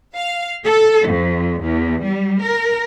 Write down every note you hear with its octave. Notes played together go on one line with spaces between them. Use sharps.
F5
A4
F2
E2
G3
A#4